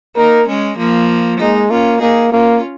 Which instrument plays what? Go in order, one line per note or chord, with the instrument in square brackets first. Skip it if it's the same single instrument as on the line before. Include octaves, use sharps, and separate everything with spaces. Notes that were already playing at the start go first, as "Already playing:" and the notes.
[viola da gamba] A#3 D#4 [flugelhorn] A#4
[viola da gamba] G#3 C#4
F3 A#3
[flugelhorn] G#3 [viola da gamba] A#3 D#4
[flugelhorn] A#3 [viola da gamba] C#4 F4
[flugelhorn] A#3 [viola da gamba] D#4 G#4
[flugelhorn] A#3 [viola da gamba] C#4 F4